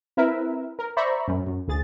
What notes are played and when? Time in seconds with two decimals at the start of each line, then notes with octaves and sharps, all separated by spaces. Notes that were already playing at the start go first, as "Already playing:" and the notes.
0.17 C4 E4 A#4 B4 E5
0.79 A#4
0.97 C5 D5 E5 A#5 B5 C#6
1.28 F#2
1.47 F#2
1.68 D2 G#4 A6